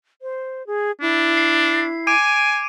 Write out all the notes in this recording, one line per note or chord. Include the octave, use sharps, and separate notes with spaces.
C5
G#4
D4 E4
C7
G#5 D6 D7 D#7